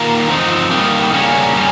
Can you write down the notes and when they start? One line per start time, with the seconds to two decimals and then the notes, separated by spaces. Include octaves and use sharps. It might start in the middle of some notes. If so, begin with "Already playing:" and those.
Already playing: D#3 A#3 F4 A#4
0.28 F3 C4 D#4
0.71 G3 A#3 D#4
1.13 C#3 G3 A#3 C#4
1.55 G3 C#4